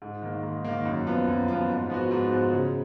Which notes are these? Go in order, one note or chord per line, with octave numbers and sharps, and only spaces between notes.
G#2
D#3 A#3
G#2
D#3 A#3
F#2
F3 B3 F4
F#2
F3 B3 F4
G#2
F3 B3 F#4
G#2
F3 B3 F#4
C#3